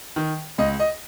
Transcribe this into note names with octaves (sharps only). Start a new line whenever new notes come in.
D#3
C#2 D#5
D#5